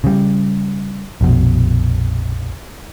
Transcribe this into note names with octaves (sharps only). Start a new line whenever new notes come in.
C#3 G3
A#1 F2 B2